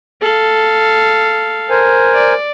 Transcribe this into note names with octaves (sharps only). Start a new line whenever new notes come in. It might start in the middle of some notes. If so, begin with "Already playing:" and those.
A4 F5
A#4 C5 G#5
D5